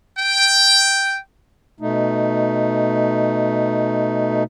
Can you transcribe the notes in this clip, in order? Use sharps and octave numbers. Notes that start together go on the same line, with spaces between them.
G5
B2 A3 D#4